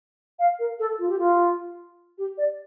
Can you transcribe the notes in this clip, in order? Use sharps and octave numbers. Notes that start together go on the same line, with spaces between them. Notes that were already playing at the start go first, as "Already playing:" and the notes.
F5
A#4
A4
F4
G4
F4
G4
D5